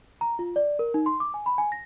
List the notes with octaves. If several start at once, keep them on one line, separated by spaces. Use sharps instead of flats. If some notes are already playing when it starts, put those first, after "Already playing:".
A#5
F4
D5
A#4
D#4
C6
D6
G#5
B5
G#5
A#6